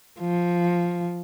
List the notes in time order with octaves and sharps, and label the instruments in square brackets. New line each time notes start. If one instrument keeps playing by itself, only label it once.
[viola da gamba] F3